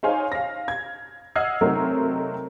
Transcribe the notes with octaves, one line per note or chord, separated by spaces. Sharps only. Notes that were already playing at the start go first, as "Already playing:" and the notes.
D#4 G#4 C5 C#5 F5 G#5
F5 A#6
G#6
D#5 F#5 E6 F6 G#6 C7
C3 F#3 A3 C4 D#4 A#4